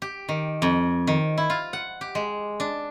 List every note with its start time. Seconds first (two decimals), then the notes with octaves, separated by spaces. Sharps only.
0.02 G4
0.29 D#3
0.62 F2
1.07 D#3
1.38 E4
1.50 F4
1.73 F#5
2.01 G4
2.15 G#3
2.60 D4